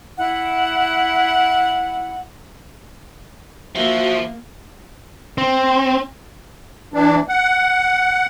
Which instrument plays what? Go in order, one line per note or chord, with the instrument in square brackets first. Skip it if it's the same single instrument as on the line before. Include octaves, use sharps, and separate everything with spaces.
[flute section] E4 F#5
[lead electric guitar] F3 [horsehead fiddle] A#3 [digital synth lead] F#4 [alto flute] E5
[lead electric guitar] C4
[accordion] E3 D4
F#5